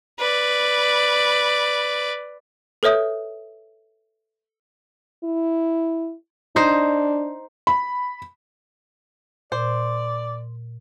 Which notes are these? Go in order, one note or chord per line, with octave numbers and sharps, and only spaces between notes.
B4 D5
A4 B4 C#5 E5 D#6 G6
E4
D4 D#4 C5
B5
A#2 C5 D5